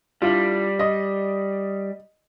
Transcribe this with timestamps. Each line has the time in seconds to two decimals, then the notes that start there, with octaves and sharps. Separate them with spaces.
0.22 G3 D4 E4 F4
0.79 D5 D#5